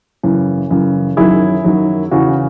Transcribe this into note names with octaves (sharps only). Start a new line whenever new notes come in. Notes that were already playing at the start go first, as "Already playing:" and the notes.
F#2 C#3 E3
F#2 C#3 E3
F#2 D#3 F#3 E4 G#4
F#2 D#3 F#3
E2 C#3 E3 F#4